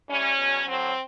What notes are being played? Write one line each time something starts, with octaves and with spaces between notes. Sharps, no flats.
A2 E3 G3 C#4
E2 B2 F#3
A2 F#3 C4